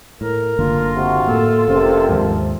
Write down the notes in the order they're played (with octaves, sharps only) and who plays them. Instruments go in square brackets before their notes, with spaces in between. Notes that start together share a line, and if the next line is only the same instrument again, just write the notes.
[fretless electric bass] A2 [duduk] A#4
[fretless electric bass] F#1 D3 A#3 [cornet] F4
[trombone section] C3 F#4
[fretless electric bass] A2 A#3 [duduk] A4
[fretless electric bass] F1 C#4 [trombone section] A#1 C3
[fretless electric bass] D#2 G#2 [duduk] F3